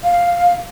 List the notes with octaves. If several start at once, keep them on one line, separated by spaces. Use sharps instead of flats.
F5